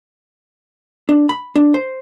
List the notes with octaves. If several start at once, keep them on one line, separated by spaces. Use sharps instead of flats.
D4
B5
D4
C5